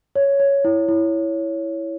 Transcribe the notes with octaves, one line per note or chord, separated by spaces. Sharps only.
C#5
C#5
E4
E4